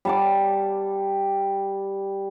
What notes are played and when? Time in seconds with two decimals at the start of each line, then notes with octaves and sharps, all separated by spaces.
0.05 G3 A5 D6